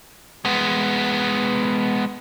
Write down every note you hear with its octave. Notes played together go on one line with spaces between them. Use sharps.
G#3 B3